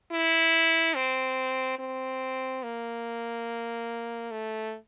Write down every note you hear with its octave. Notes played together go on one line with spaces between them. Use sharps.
E4
C4
C4
A#3
A3